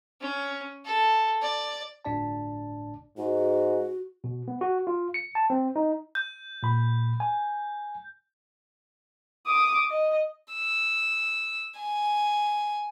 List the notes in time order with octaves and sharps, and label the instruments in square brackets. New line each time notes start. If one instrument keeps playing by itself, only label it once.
[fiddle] C#4
A4
D5
[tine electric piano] G1 A2 D4 D5 A5
[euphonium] G#2 [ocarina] F#4
[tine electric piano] B2
B3
F#4
F4
C#7
A5
C4
D#4
[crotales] G6
[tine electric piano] A#2 B5
G#5
[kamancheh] D6 D#6
D#5
[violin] E6
G#5